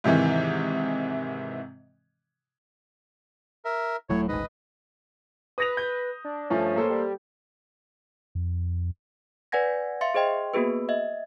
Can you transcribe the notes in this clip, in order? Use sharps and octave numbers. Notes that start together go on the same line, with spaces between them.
G#2 C3 D#3 E3
A#4 E5
D#1 A2 F#3 C#5
D#1 A1 G#2 B4 D#5
B4 D#6 A#6 F7
G6
D4
G2 F3 A3 C#4
A#3 A4 C5
G3
F2
B4 D5 F#5 G#5 G#6 A#6
E5 F5 C6 A6 C#7
G#4 C5 D#5 G5 C6
A#3 B3 F#4 G#4 B4
D#5 E5